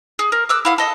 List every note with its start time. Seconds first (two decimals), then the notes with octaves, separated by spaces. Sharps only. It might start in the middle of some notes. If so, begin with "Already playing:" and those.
0.19 G#4
0.32 A#4
0.49 D6 E6 F#6
0.65 E4 F5 F#5
0.78 A4 D#5 D#6